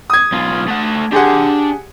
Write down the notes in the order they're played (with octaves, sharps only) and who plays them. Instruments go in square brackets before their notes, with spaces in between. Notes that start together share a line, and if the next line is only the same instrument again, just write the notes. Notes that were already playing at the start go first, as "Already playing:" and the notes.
[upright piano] D#6 G#6
[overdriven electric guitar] B1 F4
A3 F#5
[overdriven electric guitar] D4 C6 [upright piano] G4 G#4 F#5